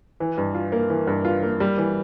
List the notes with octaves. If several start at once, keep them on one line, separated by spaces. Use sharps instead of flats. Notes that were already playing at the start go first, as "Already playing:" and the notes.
E3
G2
F4
A#3
E3
G2
F4
A#3
G3
E3